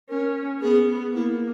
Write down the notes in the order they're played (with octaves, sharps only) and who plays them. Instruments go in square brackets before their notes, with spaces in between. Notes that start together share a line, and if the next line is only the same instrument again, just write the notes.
[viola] C#4 [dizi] A#4
[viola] B3 [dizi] G#4
[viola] A#3 [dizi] E4